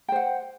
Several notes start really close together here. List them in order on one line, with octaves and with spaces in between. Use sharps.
G5 C5 F#5